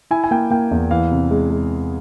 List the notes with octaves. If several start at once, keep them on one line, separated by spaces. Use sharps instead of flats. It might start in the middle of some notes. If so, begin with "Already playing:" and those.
E4 G#5
G#5
A#3 G5
A#3 G5
E2
E3 F5
C3
G#3
G#3